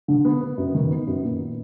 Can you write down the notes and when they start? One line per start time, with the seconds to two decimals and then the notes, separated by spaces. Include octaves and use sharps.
0.08 D3
0.25 B3
0.41 B3
0.58 F#2
0.75 D#3
0.91 B3
1.07 F#2
1.23 A#2